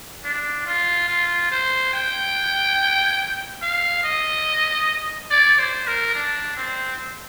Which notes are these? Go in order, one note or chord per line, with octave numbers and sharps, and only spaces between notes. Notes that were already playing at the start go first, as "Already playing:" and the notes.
D4
F4
F4
C5
G5
F5
D#5
D5
C5
A#4
D4
C4